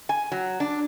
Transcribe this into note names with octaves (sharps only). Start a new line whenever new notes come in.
G#5
F#3
D4